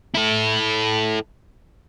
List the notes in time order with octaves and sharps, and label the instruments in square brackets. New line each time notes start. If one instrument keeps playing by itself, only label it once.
[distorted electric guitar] E4 A4